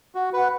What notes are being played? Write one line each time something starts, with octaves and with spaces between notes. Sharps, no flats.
F#4
B4 F#5